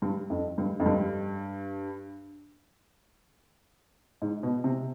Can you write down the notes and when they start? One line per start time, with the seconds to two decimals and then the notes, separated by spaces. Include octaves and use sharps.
0.02 G2
0.30 F2
0.58 G2
0.80 F2
0.86 G2
4.22 G#2
4.43 B2
4.64 C3